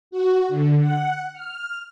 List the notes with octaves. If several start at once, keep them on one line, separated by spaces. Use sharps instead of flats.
F#4
D3
F#5
F6